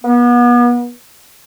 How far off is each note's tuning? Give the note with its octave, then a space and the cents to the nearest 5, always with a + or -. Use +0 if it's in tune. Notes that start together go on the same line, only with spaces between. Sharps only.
B3 -35